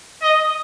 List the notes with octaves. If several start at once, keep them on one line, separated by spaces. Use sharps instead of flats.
D#5